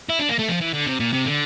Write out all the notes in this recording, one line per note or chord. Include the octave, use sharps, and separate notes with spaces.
E4
D4
A#3
A3
F3
E3
D3
C3
A#2
C3
D3